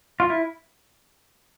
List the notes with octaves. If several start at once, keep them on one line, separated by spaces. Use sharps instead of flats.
F4
E4